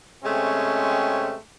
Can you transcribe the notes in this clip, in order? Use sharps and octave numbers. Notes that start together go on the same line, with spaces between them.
C3 G#3 A3 C4 C#4